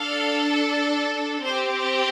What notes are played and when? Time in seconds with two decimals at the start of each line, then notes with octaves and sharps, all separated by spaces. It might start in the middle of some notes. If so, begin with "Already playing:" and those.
Already playing: D4 A4 F5
1.43 C4 G4 C5